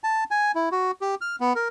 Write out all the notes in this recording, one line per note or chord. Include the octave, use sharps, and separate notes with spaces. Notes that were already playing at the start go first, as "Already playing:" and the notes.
A5
G#5
E4
F#4
G4
F6
B3
A#4